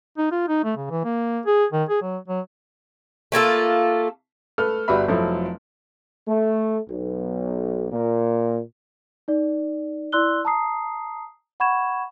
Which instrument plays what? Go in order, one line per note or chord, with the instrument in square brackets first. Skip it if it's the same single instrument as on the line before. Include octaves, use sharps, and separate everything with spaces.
[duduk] D#4
F4
D#4
A3
C#3
E3
A#3
G#4
D#3
G#4
F#3
F#3
[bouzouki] A3 A#3 F4 A4
[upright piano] A3 A4 B4 F6
G1 G3 F#4 B4 E5 B5
F1 F3 F#3 E4 A4
[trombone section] A3
B1
A#2
[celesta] D#4 D5
E4 D5 C6 E6 F#6 G7
A5 A#5 D#6 C7
F#5 B5 C#6 G#6 E7